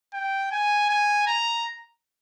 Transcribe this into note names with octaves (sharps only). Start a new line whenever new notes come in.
G5
G#5
G#5
A#5